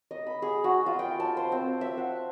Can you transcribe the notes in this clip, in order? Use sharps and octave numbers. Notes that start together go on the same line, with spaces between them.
D#5
B5
G#4
F#4
F4
G5
A5
C5
C4
E5
F#5